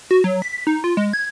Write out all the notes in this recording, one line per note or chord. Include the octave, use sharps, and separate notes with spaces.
F#4
F#3
B6
D#4
F4
G#3
G#6